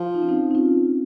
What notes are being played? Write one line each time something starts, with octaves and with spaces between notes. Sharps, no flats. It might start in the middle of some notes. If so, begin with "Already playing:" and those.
Already playing: F3
D#4
C#4
C4 D#4
D#4
C#4 F4